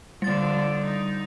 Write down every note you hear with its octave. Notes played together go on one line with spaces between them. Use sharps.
D3 F3 G3 A6
D#4